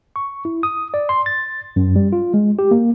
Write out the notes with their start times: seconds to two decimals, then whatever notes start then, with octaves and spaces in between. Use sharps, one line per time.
0.16 C#6
0.45 E4
0.63 D#6
0.94 D5
1.09 C6
1.26 A6
1.76 F#2
1.96 G3
2.13 F4
2.34 G#3
2.59 G4
2.71 A#3